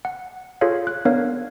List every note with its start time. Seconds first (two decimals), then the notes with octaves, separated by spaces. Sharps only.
0.05 F#5
0.61 F4 G#4 A4 C#5 F5
0.87 F#6
1.05 B3 D4 A#4 C#5 F5